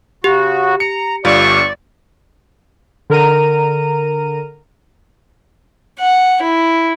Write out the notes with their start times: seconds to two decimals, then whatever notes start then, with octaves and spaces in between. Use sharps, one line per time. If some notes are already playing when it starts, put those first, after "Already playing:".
0.24 C#3 F#4 G4
0.80 A#5 C#7
1.25 G1 G3 A3 D4 F4 D5 C#6
3.10 D3 A#4 A#5 D#7
6.00 F#5
6.42 E4